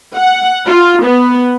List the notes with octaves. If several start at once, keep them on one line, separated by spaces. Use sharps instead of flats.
F#5
F4
B3